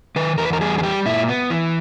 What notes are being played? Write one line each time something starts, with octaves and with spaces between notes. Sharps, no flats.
D#3 B4
E2 A#4
B4
A#4
G3 G#4
G#4
G3 G4
A#2 E4
B3
E3